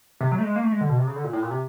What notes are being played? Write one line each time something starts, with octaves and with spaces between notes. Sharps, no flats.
C3
F#3
A3
G#3
A#3
A3
G#3
D3
B2
C3
C#3
D3
A#2
A2
A#2
C3